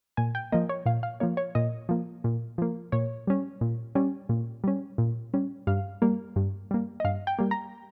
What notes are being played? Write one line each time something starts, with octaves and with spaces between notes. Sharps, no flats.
A#2 G#5
G5
F3 A#3 D#5
C#5
A#2 F5
F5
F3 A#3 C#5
C#5
A#2 D#5
F3 A#3
A#2
F3 A#3
A#2 C#5
G3 C#4
A#2
G3 C#4
A#2
G3 C#4
A#2
G3 C#4
G2 F5
G3 A#3
G2
G3 A#3
D#5
G2 F5
G5
G3 A#3
A#5